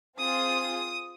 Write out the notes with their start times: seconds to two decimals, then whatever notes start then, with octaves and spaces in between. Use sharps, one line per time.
0.17 C4 F4 G#4 D#6